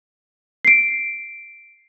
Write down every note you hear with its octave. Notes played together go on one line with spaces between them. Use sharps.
C7 D7